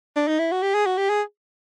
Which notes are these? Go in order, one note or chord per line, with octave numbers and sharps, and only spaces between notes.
D4
D#4
E4
F#4
G4
G#4
F#4
G4
G#4